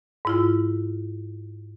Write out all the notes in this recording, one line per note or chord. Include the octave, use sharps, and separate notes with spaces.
G#2 E4 F4